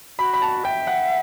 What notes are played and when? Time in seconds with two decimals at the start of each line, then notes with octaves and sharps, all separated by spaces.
0.19 F#4 B5
0.34 B5
0.42 A5
0.64 E5 G5
0.87 F#5